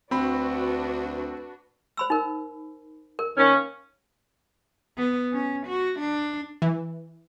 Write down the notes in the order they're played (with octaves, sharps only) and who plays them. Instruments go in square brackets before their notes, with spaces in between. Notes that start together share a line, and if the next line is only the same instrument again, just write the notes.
[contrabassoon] D2 [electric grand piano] C4 B5 [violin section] D4 F#4 B4
[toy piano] C5 B5 E6
D#4 A#4
A#4
[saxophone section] D#3 A#3 C#4
[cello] B3
C#4
F#4
D4
[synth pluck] E3